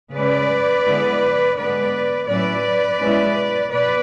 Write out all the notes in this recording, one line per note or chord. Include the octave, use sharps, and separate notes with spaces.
C#3 G#3 C#4 B4 D5
D3 G#3 B3 E4
D3 G#3 B3 B4 D5
A2 F#3 C#4 E4 B4 D5
B2 G#3 C#4 E4
B2 B4 D5